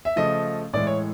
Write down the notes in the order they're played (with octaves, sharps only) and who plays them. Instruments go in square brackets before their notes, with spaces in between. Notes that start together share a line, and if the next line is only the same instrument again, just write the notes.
[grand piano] E5
C#3 F3 A3 D#5
A2 E3 G#3 D5
C#5